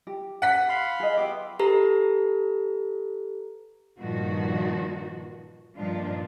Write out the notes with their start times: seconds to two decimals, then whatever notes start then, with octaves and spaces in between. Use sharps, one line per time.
0.07 G4
0.42 F#5 B6
0.69 F5 B5 C6
1.00 G#4 D#5
1.17 B3 G4 E5 C6 D6
1.59 G4 A4 B4 A#5
3.99 G2 A#2 D#3 F3 F#4
5.76 G2 A#2 D#3 F3 D4 F4